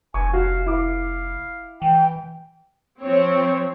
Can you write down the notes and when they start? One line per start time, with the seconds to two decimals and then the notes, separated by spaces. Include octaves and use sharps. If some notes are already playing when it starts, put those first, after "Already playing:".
0.14 F1 G#5 C#6
0.33 F#4 F5
0.66 E4 F5 D6
1.82 E3 G5
3.02 F3 C4 C#5